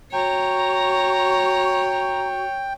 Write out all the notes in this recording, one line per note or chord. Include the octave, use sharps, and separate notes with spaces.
F#4 C#5 G5 A#5